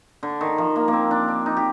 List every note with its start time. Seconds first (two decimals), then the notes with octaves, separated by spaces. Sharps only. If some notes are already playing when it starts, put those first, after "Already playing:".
0.23 D3
0.41 D#3
0.58 F3
0.76 A#3
0.88 A#3
0.93 C4
1.11 D4
1.28 D4
1.46 D#4
1.57 G4